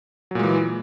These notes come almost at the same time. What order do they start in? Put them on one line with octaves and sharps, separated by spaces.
F#3 A#2 G#3 E3